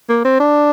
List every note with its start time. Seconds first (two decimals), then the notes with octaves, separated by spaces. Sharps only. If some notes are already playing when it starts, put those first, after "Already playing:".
0.09 A#3
0.25 C4
0.40 D4